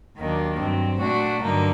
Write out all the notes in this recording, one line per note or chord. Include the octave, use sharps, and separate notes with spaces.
D#2 D#3 F#3 A#3 D4
G2 F#3 C4
A#2 A3 D4 F#4
G2 D3 F#3 A#3 D#4